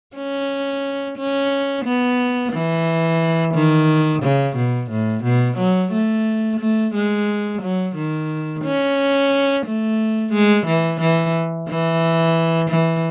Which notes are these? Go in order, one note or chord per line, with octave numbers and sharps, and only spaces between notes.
C#4
C#4
B3
E3
D#3
C#3
B2
A2
B2
F#3
A3
A3
G#3
F#3
D#3
C#4
A3
G#3
E3
E3
E3
E3